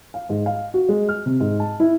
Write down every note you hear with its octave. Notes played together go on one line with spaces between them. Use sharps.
F5
G#2
F5
F#4
G#3
F6
C3
G#2
A5
E4